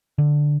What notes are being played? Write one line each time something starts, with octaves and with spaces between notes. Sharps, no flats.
D3